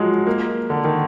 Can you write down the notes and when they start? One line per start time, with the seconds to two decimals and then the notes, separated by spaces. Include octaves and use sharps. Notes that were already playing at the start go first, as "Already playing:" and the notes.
Already playing: F3 F#3 G#3
0.27 A#3
0.70 D3
0.84 D#3